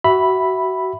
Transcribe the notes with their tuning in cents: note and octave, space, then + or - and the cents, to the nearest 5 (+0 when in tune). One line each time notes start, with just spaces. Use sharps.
F#4 +25 E5 +0 B5 +0